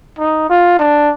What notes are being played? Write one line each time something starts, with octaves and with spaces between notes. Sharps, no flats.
D#4
F4
D4